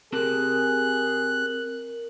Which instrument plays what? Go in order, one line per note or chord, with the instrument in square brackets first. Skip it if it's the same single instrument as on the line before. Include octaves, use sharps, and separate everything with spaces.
[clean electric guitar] C4 G4 A5 [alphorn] G#4 [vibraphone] A#4 [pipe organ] F#6